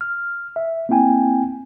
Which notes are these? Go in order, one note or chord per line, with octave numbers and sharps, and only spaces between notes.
F6
E5
A#3 C4 E4 G5 G#5